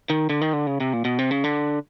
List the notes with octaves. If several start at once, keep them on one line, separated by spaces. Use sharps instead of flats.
D#3
D3
D#3
D3
C#3
C3
A#2
B2
C3
C#3
D3